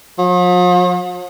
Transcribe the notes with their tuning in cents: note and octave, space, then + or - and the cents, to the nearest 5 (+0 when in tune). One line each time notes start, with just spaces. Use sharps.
F3 +45